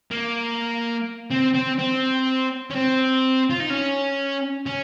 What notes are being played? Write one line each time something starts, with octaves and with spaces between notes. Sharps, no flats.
A#3
C4
C4
C4
C#4
C4
F4
D#4
C#4
C#4